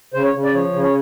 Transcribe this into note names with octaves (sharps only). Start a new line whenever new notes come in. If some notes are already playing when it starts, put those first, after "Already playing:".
C#3 C5
C#5
C#3
D5
F3 C#5
C#3
C#5